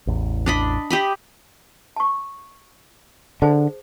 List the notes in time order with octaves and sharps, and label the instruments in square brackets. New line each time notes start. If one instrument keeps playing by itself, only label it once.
[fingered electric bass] A1 E2
[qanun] D4 D#5 B5
G4 D#5 B5
[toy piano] A5 C#6
[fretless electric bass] D3 [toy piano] G#4 C5 A5